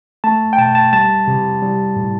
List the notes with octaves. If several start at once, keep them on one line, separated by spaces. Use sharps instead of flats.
A3 A5
G5
B2 A5
A5
G3 A5
C3
G3
A2